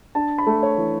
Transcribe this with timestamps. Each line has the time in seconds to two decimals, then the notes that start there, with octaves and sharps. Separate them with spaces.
0.15 D4 A5
0.38 B5
0.47 A3
0.63 C#5
0.78 E3